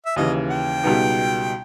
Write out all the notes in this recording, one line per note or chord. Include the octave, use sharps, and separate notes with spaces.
E5
D#2 C#3 E3 D#5
G5
C#2 B2 G3 B3 D#4